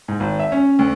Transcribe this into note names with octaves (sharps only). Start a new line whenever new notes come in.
G#2
G#1
E5
C#4
D2